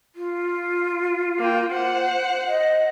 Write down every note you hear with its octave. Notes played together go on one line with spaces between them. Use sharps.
F4
A#3 G5
C5 F#5
D#5